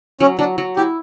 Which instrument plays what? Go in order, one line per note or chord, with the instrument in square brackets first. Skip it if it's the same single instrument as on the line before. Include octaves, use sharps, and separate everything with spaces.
[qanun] F#3 [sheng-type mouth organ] C#4
[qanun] F#3 [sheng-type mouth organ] D4
[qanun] F#3
[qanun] E4 [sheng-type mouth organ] G4